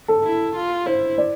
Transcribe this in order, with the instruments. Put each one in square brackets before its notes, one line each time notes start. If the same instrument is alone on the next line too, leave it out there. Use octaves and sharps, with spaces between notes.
[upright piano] A4
[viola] E4
F4
[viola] E4 [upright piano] C5
[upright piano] D5